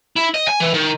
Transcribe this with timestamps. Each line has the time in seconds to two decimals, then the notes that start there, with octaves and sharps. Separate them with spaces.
0.16 E4
0.34 D#5
0.48 G#5
0.60 E3
0.74 D#3